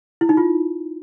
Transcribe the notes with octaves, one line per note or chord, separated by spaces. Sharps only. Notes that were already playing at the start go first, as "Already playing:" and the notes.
E4
D#4
F4